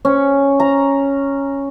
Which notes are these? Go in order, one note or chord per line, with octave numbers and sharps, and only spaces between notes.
C#4
A#5